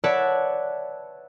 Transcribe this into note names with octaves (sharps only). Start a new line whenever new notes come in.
B4 C#5 D5 E5 F#5 A5